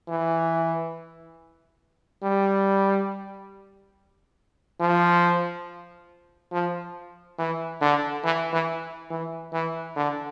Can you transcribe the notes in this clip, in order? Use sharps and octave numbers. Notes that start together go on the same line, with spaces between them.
E3
G3
F3
F3
E3
D3
E3
E3
E3
E3
D3